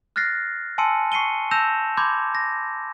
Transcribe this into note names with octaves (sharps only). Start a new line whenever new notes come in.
F6 F#6 A6 A#6 C7
G#5 A5 C6 E6 C#7 D#7
C#6 C7 C#7 D#7 G7
A5 E6 G6 A#6 E7 F7
B5 C6 D6 G6 G#6
A#6